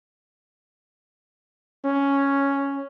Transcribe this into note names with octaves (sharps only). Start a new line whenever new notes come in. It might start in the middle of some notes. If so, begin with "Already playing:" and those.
C#4